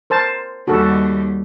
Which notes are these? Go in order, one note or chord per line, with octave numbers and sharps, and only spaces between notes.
A#4 C5 A5
D#2 G3 F#4 A4